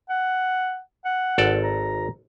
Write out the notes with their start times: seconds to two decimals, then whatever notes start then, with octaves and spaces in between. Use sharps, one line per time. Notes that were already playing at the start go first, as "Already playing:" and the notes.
0.10 F#5
1.05 F#5
1.38 G#1 A4 D5
1.64 A#5